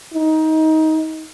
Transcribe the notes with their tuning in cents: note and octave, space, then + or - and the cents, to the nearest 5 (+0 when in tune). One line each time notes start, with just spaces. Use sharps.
D#4 +20